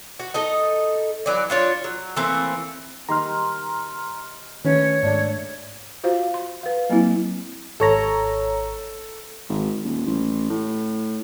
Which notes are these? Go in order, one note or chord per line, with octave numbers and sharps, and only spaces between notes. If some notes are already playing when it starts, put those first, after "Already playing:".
F#4
D#4 A4 D#5
E3 F#3 D5
D4 F4 C#5
F#3
E3 A3 A#3 C4
D#3 G3 D#4 A#5 C6 F6
D#3 A3 C#4 B4 C#5
G#2 A3 D4 D5
F4 F#4 C5 F5
C6
B4 F5
F#3 A#3 C4 E4
G#1 A4 C#5 A#5
G#1
D#1
A1
A2